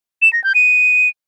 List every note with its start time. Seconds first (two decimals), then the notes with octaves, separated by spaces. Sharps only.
0.22 E7
0.33 A#6
0.44 G6
0.55 D#7